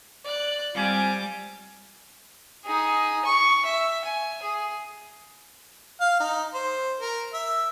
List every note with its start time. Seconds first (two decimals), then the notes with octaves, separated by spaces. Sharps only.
0.25 D5 F#6
0.75 G3 C4 F4 G#5 D6
2.65 D#4 G#4
3.25 C#6
3.65 E5
4.05 G#5
4.42 G#4
6.01 F5
6.20 D#4
6.54 C5
7.01 A#4
7.34 E5